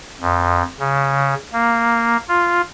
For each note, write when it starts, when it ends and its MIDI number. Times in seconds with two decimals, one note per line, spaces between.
0.21 0.63 41
0.80 1.34 49
1.53 2.17 58
2.28 2.61 65